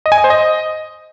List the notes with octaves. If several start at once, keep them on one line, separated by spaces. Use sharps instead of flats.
D#5
G#5
D#5
C5
D#5